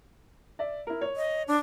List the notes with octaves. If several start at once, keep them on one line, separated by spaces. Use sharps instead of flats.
D5 E5
E4 A#4
C#5
D#5
D4